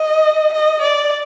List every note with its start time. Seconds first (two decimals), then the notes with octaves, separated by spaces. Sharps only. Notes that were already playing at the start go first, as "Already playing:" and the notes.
Already playing: D#5
0.53 D#5
0.82 D5